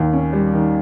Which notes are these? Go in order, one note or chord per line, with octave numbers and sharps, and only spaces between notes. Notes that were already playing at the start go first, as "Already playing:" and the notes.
Already playing: D#2 D#3
C#4
G3
D#3